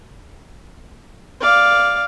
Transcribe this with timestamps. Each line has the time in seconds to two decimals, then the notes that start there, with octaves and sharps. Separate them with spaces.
1.40 D5 F5